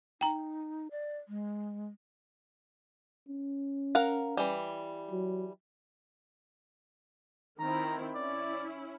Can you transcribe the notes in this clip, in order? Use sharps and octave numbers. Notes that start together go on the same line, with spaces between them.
D#4 G5 A#5
D5
G#3
C#4
A#4 F5 F#5
E3 G3
F#3
D#3 C4 E4 A#5
C#4 E4 D5